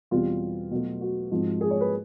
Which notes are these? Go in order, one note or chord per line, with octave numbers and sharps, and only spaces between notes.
E2 B2 G3 C4 F4
B2 F#3 A3
F#4
G#2 F3 G#3 C4
G#4
C#5
B4